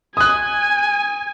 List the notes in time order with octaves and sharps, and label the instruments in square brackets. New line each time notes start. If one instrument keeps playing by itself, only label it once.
[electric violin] G#5 [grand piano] D#6 F#6